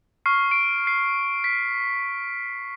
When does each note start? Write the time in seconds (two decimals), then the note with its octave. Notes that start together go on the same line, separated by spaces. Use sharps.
0.26 C#6 F6 C7
0.51 D7
0.87 C7
1.44 B6